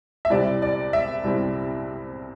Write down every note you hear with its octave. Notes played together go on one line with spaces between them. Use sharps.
E5
C2 C3 G3 C4 E4 D5
D5
E5
C2 C3 G3 C4 E4